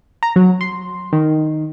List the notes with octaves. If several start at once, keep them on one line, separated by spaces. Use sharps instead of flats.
A#5
F#3
C6
D#3